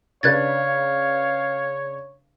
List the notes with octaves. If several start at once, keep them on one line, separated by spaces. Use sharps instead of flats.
C#3 D4 B4 C#5 F5 F#6 G#6 A6